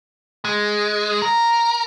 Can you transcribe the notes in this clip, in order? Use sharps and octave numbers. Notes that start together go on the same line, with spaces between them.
G#3
A#4